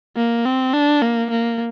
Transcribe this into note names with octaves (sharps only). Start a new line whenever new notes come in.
A#3
C4
D4
A#3
A#3